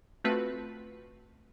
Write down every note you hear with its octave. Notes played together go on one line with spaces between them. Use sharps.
A3 C4 F4 F#4 B4